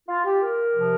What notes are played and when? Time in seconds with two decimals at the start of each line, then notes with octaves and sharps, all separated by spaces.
0.09 F4
0.25 G4
0.41 A#4
0.74 C3 F3